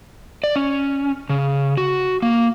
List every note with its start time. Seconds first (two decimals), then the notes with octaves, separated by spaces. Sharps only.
0.44 D5
0.56 C#4
1.30 C#3
1.78 F#4
2.22 A#3